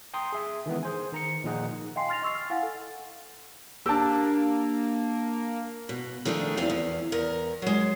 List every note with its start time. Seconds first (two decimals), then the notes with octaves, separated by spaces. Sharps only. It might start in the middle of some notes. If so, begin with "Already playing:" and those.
0.14 G5 A#5 C6 D#6
0.33 G#4 E5 G#5
0.66 D#3 E3 G#3 B3
0.83 G#4 C5 G#5
1.12 D#3 A#5 C#7
1.44 A#2 D#3 F3 D#4 G#4 F#5
1.96 D#5 F5 G5 G#5 C6 C7
2.09 C6 F6 A6 A#6 F7
2.22 D#5 C#6 E6 A6 C7
2.35 F6
2.50 E4 F5 F#5 G#5 A6
2.63 A4
3.86 A#3 D4 G4 A5 E6
5.89 B2
6.25 D#3 F3 A3 D4 G#4
6.57 E2 E3 C4 F5
6.70 E2
7.12 E2 A#4
7.62 F#3 G#3